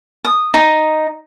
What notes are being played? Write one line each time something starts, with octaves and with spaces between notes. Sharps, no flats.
D#6
D#4